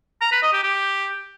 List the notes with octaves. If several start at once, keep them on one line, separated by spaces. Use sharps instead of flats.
A#5
B4
D#5
G4
G4